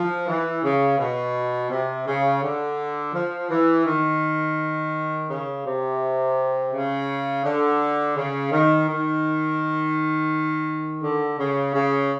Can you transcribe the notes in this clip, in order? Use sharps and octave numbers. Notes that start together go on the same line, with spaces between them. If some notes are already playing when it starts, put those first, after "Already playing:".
Already playing: F3
E3
C#3
B2
C3
C#3
D3
F3
E3
D#3
C#3
C3
C#3
D3
C#3
D#3
D#3
D3
C#3
C#3